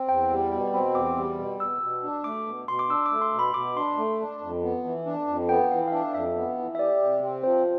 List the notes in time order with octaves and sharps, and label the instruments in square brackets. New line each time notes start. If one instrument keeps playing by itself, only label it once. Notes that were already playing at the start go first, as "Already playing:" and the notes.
Already playing: [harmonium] C4
[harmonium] E2 [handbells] G5
[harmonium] G3
[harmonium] B2 [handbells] G5
[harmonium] C4 [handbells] B5
[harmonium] E2 [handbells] D6
[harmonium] G3
B2
[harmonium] B2 [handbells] E6
[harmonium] B2
D4
[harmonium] A3 [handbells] D6
[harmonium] B2
[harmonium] B2 [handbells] C6
[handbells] D6
[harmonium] D4 [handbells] E6
[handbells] D6
[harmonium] A3
[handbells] C6
[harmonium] B2
[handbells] B5
[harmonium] B2 [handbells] D6
[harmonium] D4 [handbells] C6
[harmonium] A3
D4
F2
B3
E3
D4
F2
[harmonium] B3 [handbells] G5
[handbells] G5
[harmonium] E3 [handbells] F5
[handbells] F5
[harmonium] D4 [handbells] E5
[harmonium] F2 [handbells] E5
[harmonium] B3
E3
[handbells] E5
[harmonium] G4 [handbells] D5
[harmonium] C3
C4
[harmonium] F3 [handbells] C5